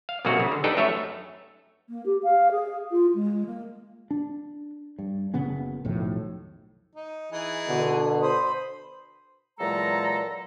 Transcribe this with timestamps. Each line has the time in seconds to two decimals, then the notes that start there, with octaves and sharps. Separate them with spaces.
0.09 F5
0.25 B1 F#2 C3 A#3 F#4 F#5
0.40 C#3
0.52 D3
0.64 D4 D#4 G4 A4 B4
0.77 F#2 A3 C#5 E5
1.89 A#3
2.05 G4
2.23 F5
2.51 G#4
2.91 F4
3.14 G#3
3.45 A#3
4.11 D4
4.99 G2
5.34 F#1 C#3 B3 C#4
5.85 B1 F2 A2 D#3
6.95 D#4
7.32 E3 D#4 G#4
7.68 B2 D3
8.22 C5 B5 D#6
9.60 E2 A#2 F#3 G#3 A4 A#5